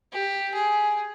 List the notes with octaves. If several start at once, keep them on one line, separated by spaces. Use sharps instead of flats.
G4
G#4